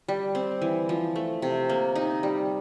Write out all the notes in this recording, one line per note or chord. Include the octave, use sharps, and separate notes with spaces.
G3
C4
E3
F3
A3
C3
A#3
D#4
G3